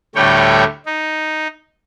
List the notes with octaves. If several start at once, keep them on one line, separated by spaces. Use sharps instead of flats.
D2 A2 G3 A3 C#5 G5
D#4